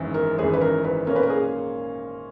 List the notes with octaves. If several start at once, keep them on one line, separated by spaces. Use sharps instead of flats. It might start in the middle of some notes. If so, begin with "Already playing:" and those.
Already playing: G#1 F#2 E3
A#4
G#1 F#2 E3 G#4
B4
A#4
B4
A#2 A#3 C#4 A#4
B4
A#4
G#4